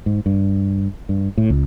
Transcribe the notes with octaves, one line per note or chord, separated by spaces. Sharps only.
G#2
G2
G2
A2
C#2